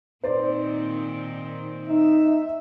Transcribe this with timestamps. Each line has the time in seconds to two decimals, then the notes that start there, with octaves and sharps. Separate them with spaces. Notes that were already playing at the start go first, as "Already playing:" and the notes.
0.24 A#2 D#3 C4 C5 D5
1.89 D#4 E5